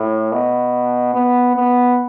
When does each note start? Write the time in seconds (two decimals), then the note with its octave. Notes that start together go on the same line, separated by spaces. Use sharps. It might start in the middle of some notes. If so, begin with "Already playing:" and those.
Already playing: A2
0.32 B2
1.14 B3
1.56 B3